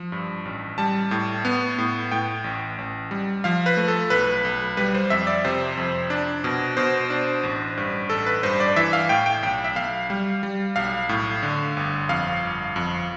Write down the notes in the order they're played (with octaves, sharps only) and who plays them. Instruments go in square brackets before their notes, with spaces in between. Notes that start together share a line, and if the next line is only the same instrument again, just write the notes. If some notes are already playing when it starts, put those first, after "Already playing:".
Already playing: [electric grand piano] F3
G2
A1
G3 A5
A2
B3
A2
A2 G5
A1
A1
G3
F3 F5
B4
A3
A4
B1 B4
B1
G3 B4
C5
F2 E5
D5
C3 C5
F2
D4
B2
B2 C5
D4
A1
G2
A1 A4
B4
G2 C5
D5
E3 E5
F5
A2 G5
G5
B1 G5
E5
B1 F5
G3
G3
B1 F5
A2
D3
G1
F2 F5
G1
F2